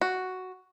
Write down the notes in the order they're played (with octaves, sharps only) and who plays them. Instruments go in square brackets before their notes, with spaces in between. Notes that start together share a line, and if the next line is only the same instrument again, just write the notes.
[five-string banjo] F#4